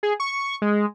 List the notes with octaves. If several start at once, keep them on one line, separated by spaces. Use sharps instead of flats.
G#4
C#6
G#3